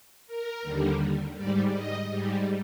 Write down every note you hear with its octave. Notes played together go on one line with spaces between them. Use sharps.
A#4
D#2 D3 G3
G#2 G3 D5
D#5
G#2 G3